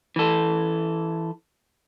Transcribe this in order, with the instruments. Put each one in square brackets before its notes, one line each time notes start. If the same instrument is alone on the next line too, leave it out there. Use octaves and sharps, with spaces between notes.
[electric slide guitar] E3 A4